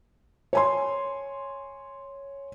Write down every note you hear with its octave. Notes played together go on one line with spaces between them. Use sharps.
C#5 G#5 C6